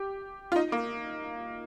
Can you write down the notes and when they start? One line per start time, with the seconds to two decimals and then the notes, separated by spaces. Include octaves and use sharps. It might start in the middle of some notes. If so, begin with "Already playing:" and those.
Already playing: G4
0.52 F4
0.56 D#4
0.72 A#3